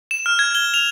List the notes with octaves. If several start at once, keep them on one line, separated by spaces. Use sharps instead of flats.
E7
F6
G#6
G7
F7